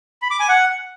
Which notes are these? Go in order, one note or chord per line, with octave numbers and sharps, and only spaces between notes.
B5
D6
G#5
F#5